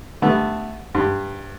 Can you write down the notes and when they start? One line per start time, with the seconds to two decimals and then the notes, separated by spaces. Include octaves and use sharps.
0.22 D3 G3 A3 B3
0.95 G2